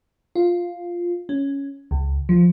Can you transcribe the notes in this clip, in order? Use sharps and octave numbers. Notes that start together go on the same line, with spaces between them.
F4
C#4
C#2
F3